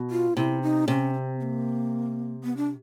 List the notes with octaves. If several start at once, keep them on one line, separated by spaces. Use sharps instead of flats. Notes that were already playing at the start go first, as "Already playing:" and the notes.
Already playing: B2
F4
C3 E4
D#4
C3 C#4
C#4
C4
B3
A#3
B3
D4